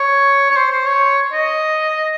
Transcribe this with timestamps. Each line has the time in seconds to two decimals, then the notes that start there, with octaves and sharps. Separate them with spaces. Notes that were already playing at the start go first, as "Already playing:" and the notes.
Already playing: C#5
0.50 C#5
0.56 C5
0.71 C5
0.86 C#5
1.33 D#5